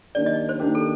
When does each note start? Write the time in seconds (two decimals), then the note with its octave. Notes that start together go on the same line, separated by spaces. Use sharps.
0.15 D#3 A#3 D4 G4 D5
0.26 D#5
0.49 C5
0.60 D#3 A#3 D4 G4 A#4
0.75 A4